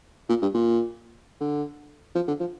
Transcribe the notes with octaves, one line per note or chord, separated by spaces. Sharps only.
A#2
G2
A#2
D3
F3
D3
F3